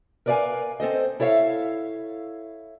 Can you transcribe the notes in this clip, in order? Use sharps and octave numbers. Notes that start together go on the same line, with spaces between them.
A#4 B4 D5 E5 F5 G#5
C4 A4 C5 D#5
E4 A4 C#5 E5 F5